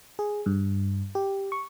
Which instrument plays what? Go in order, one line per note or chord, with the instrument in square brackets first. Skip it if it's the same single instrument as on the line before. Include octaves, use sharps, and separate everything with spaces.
[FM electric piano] G#4
G2
G4
C#6